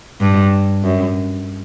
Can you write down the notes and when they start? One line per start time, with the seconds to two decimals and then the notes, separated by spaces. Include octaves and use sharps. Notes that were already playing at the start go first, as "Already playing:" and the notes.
0.21 G2
0.82 F#2